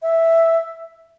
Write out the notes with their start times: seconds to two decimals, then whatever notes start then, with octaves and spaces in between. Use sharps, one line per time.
0.02 E5